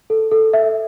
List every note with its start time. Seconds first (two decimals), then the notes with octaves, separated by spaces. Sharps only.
0.10 A4
0.31 A4
0.53 E5